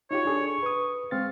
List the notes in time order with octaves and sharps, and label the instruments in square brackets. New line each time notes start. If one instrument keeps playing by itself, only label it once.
[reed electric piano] D#4 F4 G4 [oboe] C#5
[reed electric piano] D4 G#4 A4
[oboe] C#6
[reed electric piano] B4 D#6
[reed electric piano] G#3 C4 A6 [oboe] F5